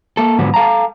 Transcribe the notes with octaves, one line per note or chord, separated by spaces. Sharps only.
A#3 A4
G#2 D3 F3 F#3 B3
A4 F5 A5 A#5